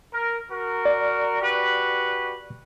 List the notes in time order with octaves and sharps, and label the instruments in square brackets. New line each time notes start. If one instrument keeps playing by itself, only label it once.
[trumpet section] A#4
F#4 A#4
[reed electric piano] D5
[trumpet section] F#4 G4 B4